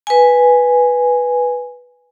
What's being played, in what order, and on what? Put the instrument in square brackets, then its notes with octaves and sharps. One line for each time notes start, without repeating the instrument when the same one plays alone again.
[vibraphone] B4 G#5